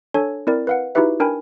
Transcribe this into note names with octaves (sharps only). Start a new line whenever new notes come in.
D4 A4 C#5 G#5
C4 E4 A#4 D5
B4 F5 F#5
D#4 E4 F#4 G4 B4 E5
D4 A#4 G5 G#5 B5